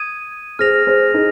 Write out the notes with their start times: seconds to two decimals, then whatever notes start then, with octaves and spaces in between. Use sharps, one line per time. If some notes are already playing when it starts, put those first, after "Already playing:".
Already playing: D#6 G#6 D#7
0.59 G#4 C5 F6 A#6 F7
0.87 G#4 C5
1.14 D#4 G#4